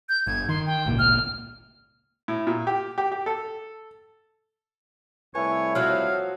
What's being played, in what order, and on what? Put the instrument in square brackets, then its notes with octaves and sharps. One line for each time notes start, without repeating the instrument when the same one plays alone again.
[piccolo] G6
[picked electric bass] G1 [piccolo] G#6
[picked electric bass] D#3 [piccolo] C6
[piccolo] G5
[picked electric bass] G#1 C#2 A#2
[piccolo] F6
[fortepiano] A2
A#2
G4
G4
G4
A4
[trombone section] C2 A3 E4 [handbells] B4 G#5 [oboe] C#5
[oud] F3 F#3 [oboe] F5 [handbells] E6 F6